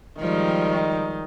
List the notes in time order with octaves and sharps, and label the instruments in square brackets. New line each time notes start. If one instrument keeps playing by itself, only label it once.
[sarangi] D#3 [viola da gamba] F3 G3 G#3